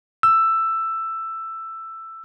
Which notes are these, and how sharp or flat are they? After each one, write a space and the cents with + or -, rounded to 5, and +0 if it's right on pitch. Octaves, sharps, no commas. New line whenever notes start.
E6 +10